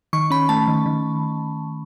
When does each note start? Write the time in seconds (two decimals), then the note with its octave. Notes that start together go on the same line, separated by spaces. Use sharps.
0.13 D#3 C#6
0.30 C#4 B5
0.49 A3 A5
0.68 D#3
0.86 D#3